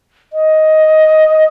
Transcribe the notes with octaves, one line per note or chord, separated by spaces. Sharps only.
D#5